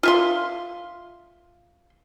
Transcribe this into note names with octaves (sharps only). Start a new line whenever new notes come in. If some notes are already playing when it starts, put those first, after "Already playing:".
F4 E5 C6